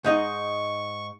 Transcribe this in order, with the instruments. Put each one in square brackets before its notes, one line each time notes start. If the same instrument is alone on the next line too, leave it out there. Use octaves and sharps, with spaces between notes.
[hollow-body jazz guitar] G#2 D#4 D#5 [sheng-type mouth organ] C#6